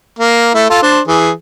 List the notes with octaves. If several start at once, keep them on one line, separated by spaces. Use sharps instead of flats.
A#3
A3 E4
F4 A4
D4 C5
E3 G#4